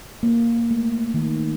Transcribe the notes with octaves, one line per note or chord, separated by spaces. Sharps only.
A#3
A3
D#3